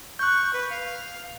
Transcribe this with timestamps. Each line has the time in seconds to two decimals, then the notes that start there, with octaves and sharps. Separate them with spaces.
0.19 C#6 F#6 G6
0.53 B4
0.70 F5